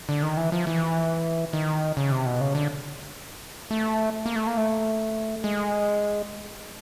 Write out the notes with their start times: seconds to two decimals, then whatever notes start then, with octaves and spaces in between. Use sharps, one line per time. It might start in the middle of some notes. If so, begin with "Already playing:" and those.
0.09 D3
0.23 D#3
0.37 E3
0.52 F3
0.67 E3
1.53 D#3
1.97 C#3
2.12 C3
2.26 B2
2.41 C#3
2.55 D3
3.71 A3
4.26 A#3
4.36 A3
4.47 A#3
4.57 A3
5.44 G#3